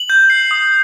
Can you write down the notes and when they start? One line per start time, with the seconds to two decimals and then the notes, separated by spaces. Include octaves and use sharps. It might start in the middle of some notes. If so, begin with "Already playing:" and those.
Already playing: F#7
0.10 G6
0.30 C7
0.51 D#6